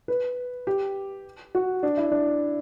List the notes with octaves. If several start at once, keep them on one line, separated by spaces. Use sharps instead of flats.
B4
G4
F#4
D4
E4
D4